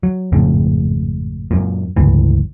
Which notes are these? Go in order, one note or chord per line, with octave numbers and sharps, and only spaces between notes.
F#3
G#1 F2 A2 C#3
F#2 A#2
G1 C#2 A2 E3